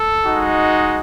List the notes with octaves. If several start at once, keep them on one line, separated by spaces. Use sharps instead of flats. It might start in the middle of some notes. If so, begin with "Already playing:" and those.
Already playing: A4
G#3 D#4 F#4